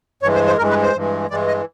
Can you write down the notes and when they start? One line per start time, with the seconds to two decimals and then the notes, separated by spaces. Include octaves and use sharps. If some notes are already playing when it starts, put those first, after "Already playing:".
0.23 G2 E3 G#3 C#5
0.35 C5
0.46 C5
0.58 G2 E3 G#3 A#4
0.70 B4
0.82 C5
0.94 G2 E3 G#3
1.30 G2 E3 G#3 D5
1.48 D#5